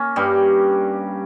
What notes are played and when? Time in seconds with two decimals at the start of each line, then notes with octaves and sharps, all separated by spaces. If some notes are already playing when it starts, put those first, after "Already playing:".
Already playing: A#3 C#4
0.16 G2 G3